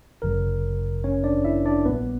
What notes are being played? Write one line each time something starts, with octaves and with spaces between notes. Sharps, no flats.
G1 F#2 C#3 F#3 A#4
C#4 C#5
D4 D5
E4 E5
D4 D5
A#1 A#2 G3 B3 B4